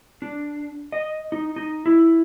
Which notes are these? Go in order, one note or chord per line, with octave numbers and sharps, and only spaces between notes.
D4
D#5
D#4
D#4
E4